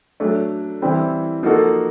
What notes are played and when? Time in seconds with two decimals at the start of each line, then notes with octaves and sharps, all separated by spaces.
0.20 F#3 A3 D4
0.82 E3 G3 C4 E4
1.43 F3 A#3 D#4 F#4 A4